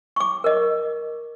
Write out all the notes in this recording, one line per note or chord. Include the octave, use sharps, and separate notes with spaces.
C#6 D6
A#4 D#5